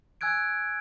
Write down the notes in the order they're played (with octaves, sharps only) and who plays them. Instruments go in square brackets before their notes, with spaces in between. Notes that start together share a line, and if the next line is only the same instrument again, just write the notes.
[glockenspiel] G#5 E6 F#6 G#6 D7